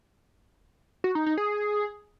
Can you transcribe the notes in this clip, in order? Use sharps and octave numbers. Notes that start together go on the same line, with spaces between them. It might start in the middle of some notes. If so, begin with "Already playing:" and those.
F#4
D#4
D#4
G#4